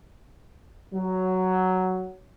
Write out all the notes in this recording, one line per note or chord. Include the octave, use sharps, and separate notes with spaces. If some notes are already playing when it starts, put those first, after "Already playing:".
F#3